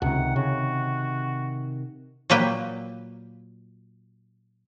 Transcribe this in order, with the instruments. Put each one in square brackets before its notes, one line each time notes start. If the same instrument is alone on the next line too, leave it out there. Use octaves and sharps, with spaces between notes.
[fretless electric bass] C#2 [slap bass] C3 D#3 [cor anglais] F#5
[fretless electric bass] C#3 [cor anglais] F#4
[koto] A#2 F#3 A#3 B4 G5